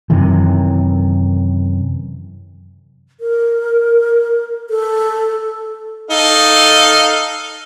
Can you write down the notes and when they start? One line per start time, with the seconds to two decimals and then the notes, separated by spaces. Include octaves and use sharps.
0.10 F#2 C3 D#3 E3
3.20 A#4
4.70 A4
6.11 D#4 A4 F5